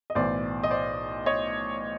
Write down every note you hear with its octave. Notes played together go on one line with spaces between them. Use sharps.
D#5
B1 A2 E3 C5 D5
D#5
C5 D5
C#5 D#5